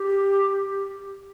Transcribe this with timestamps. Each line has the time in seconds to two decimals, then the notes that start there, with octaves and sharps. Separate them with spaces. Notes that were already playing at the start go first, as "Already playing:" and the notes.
Already playing: G4